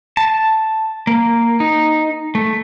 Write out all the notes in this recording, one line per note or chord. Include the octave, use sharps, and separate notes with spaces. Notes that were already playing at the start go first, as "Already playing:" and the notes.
A5
A#3
D#4
A3